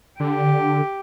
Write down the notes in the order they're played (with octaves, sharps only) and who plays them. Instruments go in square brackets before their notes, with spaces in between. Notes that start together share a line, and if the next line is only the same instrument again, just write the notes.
[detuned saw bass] D3 [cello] G4